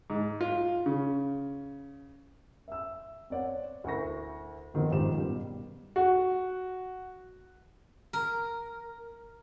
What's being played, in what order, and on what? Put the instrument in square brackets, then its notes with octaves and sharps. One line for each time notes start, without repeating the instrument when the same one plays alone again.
[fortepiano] G#2
F4
C#3
[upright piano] E5 E6
C4 C#5 D5 F#5
D2 E4 A#4 C#6 A#6
F2 D#3 F3 B3 C4
A#1 G#2 D#3 G4 E7
B2 G3
F#4
[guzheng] A#4